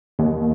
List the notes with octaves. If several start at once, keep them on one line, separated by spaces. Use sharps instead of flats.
D#2